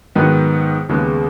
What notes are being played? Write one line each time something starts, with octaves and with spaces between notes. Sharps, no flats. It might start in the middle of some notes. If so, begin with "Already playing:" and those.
G#2 D#3 F#3 B3
D#2 C#3 G#3 B3